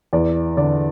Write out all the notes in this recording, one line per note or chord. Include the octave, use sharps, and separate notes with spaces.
E2 D5
D3 D5